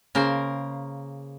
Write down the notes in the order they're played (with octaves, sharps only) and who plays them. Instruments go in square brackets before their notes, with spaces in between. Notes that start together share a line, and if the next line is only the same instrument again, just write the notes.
[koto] C#3 A#3 A#4 C5